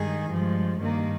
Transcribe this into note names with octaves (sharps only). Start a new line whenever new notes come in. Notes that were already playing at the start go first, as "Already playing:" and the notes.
Already playing: G2 D#3 G#3 G#4
G2 F3 G#3
G2 D#3 A#3